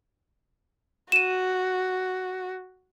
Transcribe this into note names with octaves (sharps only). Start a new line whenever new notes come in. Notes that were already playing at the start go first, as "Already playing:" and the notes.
F#4 D#7 E7